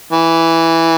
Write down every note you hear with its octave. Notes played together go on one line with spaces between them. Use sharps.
E3